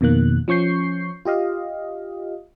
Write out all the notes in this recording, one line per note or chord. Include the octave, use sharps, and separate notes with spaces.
F2 B2 D#3 A#3 F#6
F3 C#4 C#6 G6 C7
F4 G4 D#5 F5